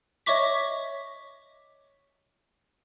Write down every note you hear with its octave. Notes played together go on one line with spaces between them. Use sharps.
C#5 D#5 E5 C#6 D6 B6